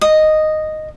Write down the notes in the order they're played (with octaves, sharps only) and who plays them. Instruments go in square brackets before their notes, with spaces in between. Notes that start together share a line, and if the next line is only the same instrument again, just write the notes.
[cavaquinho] D#5